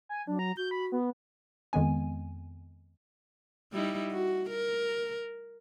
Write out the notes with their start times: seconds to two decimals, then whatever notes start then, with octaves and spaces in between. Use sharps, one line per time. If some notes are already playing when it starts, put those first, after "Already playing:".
0.09 G#5
0.27 F#3 D4
0.39 A#5
0.57 F#4 G6
0.71 B5
0.92 B3
1.73 F2 D#3 G#3 B3 G#5
3.72 G3 D#4 E4
4.12 F#4
4.50 A#4